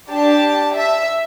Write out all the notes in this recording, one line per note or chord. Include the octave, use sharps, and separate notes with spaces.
D4 G4 A5
E5